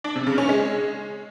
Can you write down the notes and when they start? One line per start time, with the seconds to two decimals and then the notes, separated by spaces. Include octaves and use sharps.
0.04 D4
0.16 C3
0.27 C#3
0.38 C#4
0.49 G#3